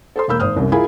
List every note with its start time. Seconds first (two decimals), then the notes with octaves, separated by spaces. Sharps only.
0.16 A4 C5 C6
0.28 E1 A#3 B5 E6 G6
0.40 G#1 C5 D#6 F6
0.56 C2 F#2
0.72 E4 F4 G#4 A#4 G#5 B5